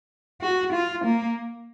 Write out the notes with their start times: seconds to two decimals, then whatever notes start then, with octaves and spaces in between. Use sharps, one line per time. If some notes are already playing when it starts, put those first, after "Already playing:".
0.41 F#4
0.73 F4
1.04 A#3